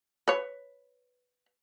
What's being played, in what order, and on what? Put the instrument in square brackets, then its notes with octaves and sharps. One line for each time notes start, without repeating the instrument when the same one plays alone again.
[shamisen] B4 C#5